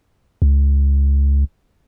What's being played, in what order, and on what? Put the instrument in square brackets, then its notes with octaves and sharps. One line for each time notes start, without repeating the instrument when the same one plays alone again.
[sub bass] C#2